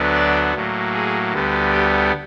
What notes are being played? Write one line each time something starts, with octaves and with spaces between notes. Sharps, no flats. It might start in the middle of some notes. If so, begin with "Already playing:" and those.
Already playing: D2 D3 F#3 B3 D4
D5
A2 F#3 A#3
G#4
D2 D3 G3 B3
G4